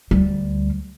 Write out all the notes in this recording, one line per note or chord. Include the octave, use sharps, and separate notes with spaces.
D2 G3